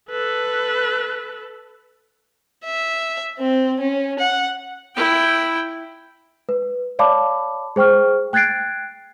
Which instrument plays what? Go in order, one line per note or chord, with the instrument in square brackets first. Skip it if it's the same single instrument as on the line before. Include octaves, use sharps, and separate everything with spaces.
[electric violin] A4 B4
[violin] E5
C4
C#4
F#5
[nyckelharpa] E4 G5
[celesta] B4
C#5 D5 F5 A5 B5 D6
G#4 C5 G5 C#6 F6
G5 F#6 G#6 A6 C7 D7